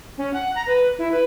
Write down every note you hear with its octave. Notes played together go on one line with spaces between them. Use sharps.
C#4
F#5
A#5
B4
E4
B4